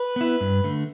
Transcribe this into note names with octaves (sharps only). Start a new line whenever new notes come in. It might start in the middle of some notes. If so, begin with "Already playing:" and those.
Already playing: B4
B3 E4
G2
D3 A3